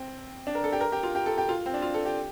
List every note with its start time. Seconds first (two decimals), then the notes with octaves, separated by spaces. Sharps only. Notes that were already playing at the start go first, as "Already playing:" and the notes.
Already playing: C4
0.47 D4
0.55 A#4
0.64 A4
0.72 G4
0.81 A#4
0.92 G4
1.03 F4
1.15 G4
1.26 A4
1.38 G4
1.49 F4
1.66 C4
1.74 D4
1.82 F4
1.94 A4
2.05 G4